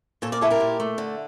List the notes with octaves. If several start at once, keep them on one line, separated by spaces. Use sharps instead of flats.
A#2 A4 C#5
A#4 D5
E4 A4 C#5
G4 A#4
A#2
A3
D3